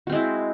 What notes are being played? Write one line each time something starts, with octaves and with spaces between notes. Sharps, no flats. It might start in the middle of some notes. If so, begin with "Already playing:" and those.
G#3 C4 E4 F#4